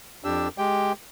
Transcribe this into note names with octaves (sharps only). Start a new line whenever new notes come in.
F2 D4 G4 E6
G#3 G4 G5